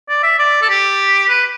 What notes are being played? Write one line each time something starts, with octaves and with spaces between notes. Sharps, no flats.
D5
E5
D5
A4
G4
B4